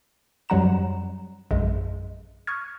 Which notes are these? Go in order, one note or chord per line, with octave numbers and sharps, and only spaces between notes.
F#2 F#3 G3 F#5 A#5 E7
A#1 F#2 G#3
C#6 D#6 F6 G#6